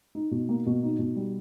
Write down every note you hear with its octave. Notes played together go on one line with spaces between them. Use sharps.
D#4
B2
A#3
B2
D#4
B2
G3